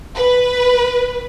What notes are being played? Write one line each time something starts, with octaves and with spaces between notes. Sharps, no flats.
B4